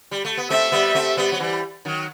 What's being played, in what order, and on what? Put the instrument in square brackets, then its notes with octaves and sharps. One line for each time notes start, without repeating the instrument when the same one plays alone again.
[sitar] G3
A3
B3
[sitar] A3 C4 [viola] E5
[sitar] G3 B3
A3 C4
G3 B3
F#3
E3 G3
D#3 F#3